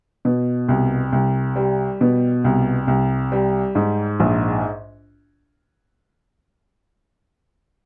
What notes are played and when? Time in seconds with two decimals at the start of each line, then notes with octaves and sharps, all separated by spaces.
0.25 B2
0.69 C2
1.12 C2
1.56 G3
2.01 B2
2.44 C2
2.88 C2
3.32 G3
3.75 G#2
4.20 A#1